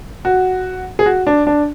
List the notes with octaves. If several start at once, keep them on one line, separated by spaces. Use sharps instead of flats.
F#4
G#4
F#4
D4
D4